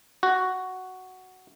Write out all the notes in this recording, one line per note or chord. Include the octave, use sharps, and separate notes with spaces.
F#4